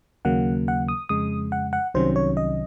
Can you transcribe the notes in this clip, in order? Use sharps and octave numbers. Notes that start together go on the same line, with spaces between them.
D#2 C#3 F#3 A#3 F#5
F#5
D#6
F2 C#3 G#3 D#6
F#5
F#5
C2 C3 D#3 F#3 C#4 C5
C#5
D#5